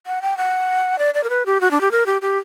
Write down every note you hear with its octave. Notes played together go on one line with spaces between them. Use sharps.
F#5
G5
F#5
D5
D5
A#4
B4
G4
F#4
D4
G4
A#4
G4
G4